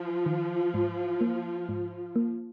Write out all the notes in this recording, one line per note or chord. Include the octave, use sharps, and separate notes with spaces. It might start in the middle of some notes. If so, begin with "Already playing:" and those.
Already playing: F3 F4
D#3
G#2
A#3
G#2
A#3